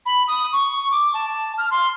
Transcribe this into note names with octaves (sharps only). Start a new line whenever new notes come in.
B5
D#6
C#6
D6
A5
F6
C6